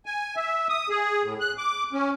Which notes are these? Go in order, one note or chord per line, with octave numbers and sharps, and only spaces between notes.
G#5
E5
D#6
G#4
A2
F#6
D6
C#4